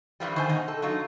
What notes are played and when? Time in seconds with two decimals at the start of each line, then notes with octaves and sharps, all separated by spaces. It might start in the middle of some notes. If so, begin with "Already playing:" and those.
0.20 G2 E3 F3 G3
0.36 D#3 C5 G#5
0.49 B2 D#4
0.68 A4
0.82 F#3 D#4 F4